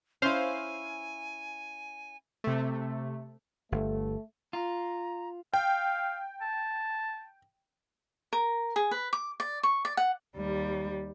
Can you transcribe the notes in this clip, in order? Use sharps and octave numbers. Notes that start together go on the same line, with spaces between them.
C#4 E4 C5 F5 G#5
C3 A3
G1 A3
F4 A#5
F5 G5
A5
A#4
G#4
B4
D6
D5
C#6
D5
F#5
D#2 G3